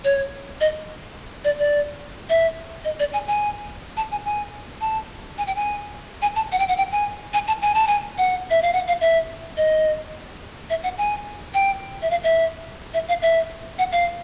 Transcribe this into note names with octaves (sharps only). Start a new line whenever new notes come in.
C#5
D#5
D5
D5
E5
D#5
D5
G#5
G#5
A5
G#5
G#5
A5
G#5
G5
G#5
G#5
A5
F#5
G5
F#5
G5
G#5
G#5
A5
G#5
A5
G#5
F#5
E5
F5
F#5
F5
E5
D#5
E5
F#5
G#5
G5
E5
F5
E5
E5
F5
E5
F#5
F5